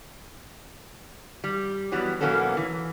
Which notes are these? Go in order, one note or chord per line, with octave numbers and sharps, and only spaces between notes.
G3
E3 F#3 G3 B3
B2 F#3 A#3 B3 C#4 A4
E3